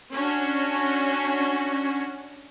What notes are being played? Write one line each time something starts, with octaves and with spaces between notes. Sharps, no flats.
C#4 D4 F#4